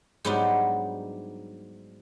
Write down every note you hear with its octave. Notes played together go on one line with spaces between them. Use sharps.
G#2 F#3 G3 B3 D4 D#4